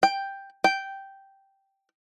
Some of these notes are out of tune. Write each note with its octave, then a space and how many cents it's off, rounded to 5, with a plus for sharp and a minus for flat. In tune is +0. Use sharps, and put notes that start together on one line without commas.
G5 +5
G5 -5